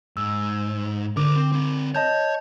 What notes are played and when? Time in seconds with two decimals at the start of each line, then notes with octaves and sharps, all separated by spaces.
0.17 G#2 E6
1.17 D3 A#4 C5 D6
1.36 C4
1.52 C4 A#4
1.95 C#5 D#5 A5 G6